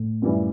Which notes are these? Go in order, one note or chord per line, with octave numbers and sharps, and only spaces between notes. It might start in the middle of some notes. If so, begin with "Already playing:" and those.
Already playing: A2
F#2 C#3 E3 G3